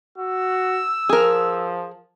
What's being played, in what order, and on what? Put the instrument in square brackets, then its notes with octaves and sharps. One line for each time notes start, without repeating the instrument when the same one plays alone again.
[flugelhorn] F#4 [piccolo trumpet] E6
[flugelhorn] F3 [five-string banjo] G#4 A#4